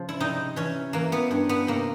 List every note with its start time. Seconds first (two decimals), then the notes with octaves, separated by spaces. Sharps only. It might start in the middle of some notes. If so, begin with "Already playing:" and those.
Already playing: C#3 F3
0.09 E4
0.20 C3 D#4
0.56 E3 C#4
0.93 E3 A#3
1.12 B3
1.31 G2
1.49 B3
1.67 C3 A#3